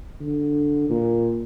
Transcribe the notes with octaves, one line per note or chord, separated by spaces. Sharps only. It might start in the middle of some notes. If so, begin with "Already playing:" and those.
D3
A#2